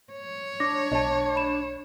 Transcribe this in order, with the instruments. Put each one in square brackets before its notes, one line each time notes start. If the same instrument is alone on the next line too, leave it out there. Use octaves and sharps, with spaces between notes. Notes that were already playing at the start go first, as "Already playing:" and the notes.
[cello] C#5
[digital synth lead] D4 [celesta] D6 A#6
[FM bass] B1 [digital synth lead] D4 [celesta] D#5 A5
[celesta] B5 E7